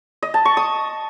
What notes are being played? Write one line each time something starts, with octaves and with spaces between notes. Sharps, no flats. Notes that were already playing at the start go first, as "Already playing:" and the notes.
D#5
A5
C#6
D#6